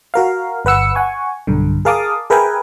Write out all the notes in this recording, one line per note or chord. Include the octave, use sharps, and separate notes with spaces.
F#4 A#4 F5
G1 B4 F#5 E6 C#7
F#5 G#5 C#6
B1 G2 D3
G#4 A#4 F5 A5 D6 D#6
G#4 A#4 B4 E5 G5 G#5